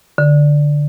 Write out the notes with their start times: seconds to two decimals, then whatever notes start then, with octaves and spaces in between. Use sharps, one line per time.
0.18 D3